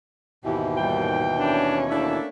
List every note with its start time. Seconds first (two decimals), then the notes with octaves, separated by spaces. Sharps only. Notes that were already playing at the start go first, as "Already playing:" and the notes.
0.44 D#2 G#2 B2 E3 E4 G4
0.76 A#2 G3 E4 G5
1.38 C#4 D4 C#5
1.90 A3 A#3 D4 E4